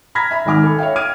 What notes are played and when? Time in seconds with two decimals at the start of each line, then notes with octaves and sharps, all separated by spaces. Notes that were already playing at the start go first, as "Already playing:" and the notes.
0.15 A#5 B5 F6 G#6 A#6 B6
0.31 E5 B5
0.45 G#1 G#2 G#5 D6 F6
0.63 A4 B5
0.78 C#5 E5 F5 G5
0.96 D6 F6 G#6 D7 D#7